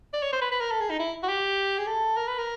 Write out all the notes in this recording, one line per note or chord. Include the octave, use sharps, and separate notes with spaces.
D5
C#5
C5
B4
B4
A#4
A4
G#4
D#4
E4
F#4
G4
G#4
A4
A#4
B4
A#4